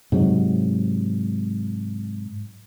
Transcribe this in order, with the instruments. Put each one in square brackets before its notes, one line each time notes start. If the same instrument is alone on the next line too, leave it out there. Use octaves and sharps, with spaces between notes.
[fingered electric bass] G#2 C3 F#3